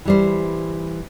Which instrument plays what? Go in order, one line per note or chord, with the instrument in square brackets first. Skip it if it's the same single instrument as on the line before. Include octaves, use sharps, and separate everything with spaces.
[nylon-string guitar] E3 G3 C5